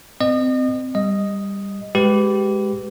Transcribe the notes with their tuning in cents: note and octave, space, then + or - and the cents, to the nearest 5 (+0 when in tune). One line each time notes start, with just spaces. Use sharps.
C4 -25 D#5 -35
G3 +15 D#5 +0
G#3 +0 G4 -20 B4 +15